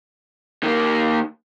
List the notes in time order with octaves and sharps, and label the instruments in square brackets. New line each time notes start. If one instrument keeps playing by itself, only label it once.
[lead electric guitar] D#3 A#3